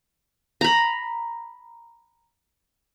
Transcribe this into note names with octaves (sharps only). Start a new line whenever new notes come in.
A#5 B5